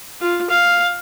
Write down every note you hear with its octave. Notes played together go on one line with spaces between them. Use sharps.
F4
F5